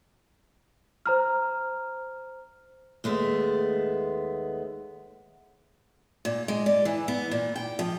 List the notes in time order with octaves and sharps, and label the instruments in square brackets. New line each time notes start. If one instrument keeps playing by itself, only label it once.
[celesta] C5 A#5 F6
[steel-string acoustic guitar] D#2 G#3 A3 B3
A#2
G#3
D5
E3
B3
A#2
G5
F3